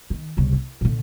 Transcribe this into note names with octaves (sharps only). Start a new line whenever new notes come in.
D#3
C2 C#3
E4
A#2 D3